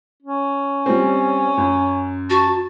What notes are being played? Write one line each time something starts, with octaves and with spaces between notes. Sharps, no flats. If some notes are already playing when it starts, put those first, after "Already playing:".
C#4
G3 C4
F#2
F#4 A5